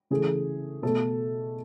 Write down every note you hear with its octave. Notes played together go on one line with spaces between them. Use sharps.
C#3 E3 A3 G#4
B2 A3 A4